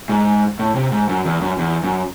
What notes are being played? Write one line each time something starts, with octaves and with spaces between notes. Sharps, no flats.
G#2
A2
C3
G#2
F#2
E2
F#2
E2
F#2